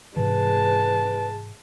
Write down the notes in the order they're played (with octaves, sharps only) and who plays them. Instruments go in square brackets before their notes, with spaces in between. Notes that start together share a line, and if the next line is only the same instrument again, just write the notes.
[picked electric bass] G#2 C3 E3 [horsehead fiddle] G#3 A5 [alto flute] B4